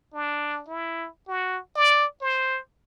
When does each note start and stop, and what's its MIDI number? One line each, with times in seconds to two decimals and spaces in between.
0.13 0.63 62
0.68 1.09 64
1.28 1.59 66
1.76 2.05 74
2.21 2.59 72